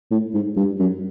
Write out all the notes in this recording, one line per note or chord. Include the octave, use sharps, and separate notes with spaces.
A2
G#2
G2
F#2